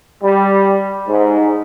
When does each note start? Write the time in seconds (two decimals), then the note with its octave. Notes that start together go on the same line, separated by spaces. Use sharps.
0.23 G3
1.08 G#2